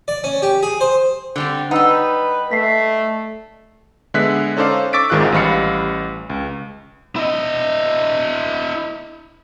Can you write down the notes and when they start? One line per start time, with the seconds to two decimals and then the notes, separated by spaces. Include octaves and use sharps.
0.08 D5
0.24 C#4
0.42 G4
0.63 G#4
0.81 C5
1.36 D3 G3 C4
1.71 G3 D#4 B4 F#5 E6
2.51 A3 B6 C7
4.14 D3 G#3 B3 E5 F#6 B6
4.57 C#4 D#4 A4 C5 D5 F5
4.93 C#6 D6 E6 A6 B6 D7
5.10 G#1 G#2 D#3 F4 G#4 F#6
5.32 A1 G3 F5 B5 C#7
6.30 C#2
7.16 E4 D#5